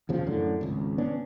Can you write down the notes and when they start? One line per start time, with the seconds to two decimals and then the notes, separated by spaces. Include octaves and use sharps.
0.09 D#2 C#3 F3
0.26 F#2 A2 D3
0.61 G#1 C#2
0.98 B3 C#4 D4